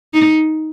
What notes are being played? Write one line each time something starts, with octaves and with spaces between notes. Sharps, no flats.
D#4